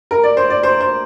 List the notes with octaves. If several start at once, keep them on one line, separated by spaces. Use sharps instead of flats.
A#4
D5
C5
D5
C5
C5